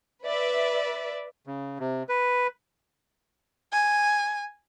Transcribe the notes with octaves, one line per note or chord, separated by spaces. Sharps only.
B4 D5 E5
C#3
C3
B4
G#5